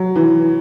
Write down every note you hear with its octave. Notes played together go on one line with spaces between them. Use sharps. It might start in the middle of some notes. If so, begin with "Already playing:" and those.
Already playing: F#3
E3